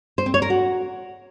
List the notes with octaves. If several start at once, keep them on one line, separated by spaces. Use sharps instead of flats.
C5
C4
C#5
A#4
F#4